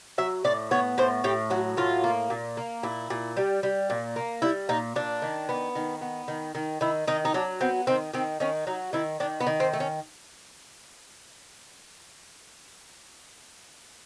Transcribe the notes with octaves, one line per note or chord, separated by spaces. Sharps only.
F#3 E5
A2 D5
B3 C#5
A2 C5
A2 G4
F#3 F#4
A2 F4
A#3
A#2
A#3
A#2 E4
A#2
G3
G3
A#2
A#3
G3 E4
A#2 D#4
A#2 D4
D#3
B3
D#3
B3
D#3
D#3
D#3 E4
D#3 D#4
D#4
F#3 D4
B3 C4
D#3 C4
D#3 C4
D#3 C#4
F#3 D#4
D#3 E4
D#3 D4
B3
D#3
C4
A3
C#4